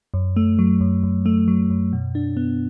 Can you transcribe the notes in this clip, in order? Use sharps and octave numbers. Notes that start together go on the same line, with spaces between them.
F#2
A3
F#3
F#2
F#2
A3
F#3
F#2
B2
D4
B3